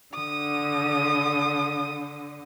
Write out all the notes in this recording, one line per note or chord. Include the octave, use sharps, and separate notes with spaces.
D3 D#6